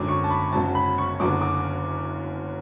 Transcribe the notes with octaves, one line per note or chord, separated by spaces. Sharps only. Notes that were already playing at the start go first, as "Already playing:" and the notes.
Already playing: G#1 F#2 D3 D6
C#6
A5
B5
G#1 F#2 C#3 F#3 A5
B5
C#6
F#1 F#2 D3 F#3 D6
D6